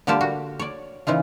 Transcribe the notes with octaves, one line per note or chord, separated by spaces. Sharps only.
D3 G3 A#3 F4 G4 A5
F#4
C#5 D5
C#3 E3 D#4 F4